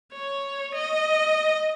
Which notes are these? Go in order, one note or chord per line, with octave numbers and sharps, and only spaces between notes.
C#5
D#5